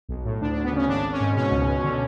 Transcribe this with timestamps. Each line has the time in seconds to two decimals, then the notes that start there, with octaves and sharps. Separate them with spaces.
0.09 B1
0.25 A2
0.41 D2 D4
0.53 D4
0.57 D2
0.64 B3
0.72 C#3 C#4
0.88 G#1 D4
1.04 G#1
1.13 C#4
1.20 G#2
1.36 B2 C#4
1.51 C#2
1.67 B2
1.84 D3